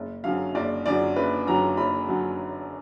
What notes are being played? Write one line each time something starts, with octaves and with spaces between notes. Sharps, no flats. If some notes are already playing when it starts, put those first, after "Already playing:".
Already playing: F#1
F#2 D3 F#3 F5
F#1 D5
F#2 D3 F#3 D5
F#1 B4
F#2 D3 F#3 A#5
F#1 B5
F#2 D3 F#3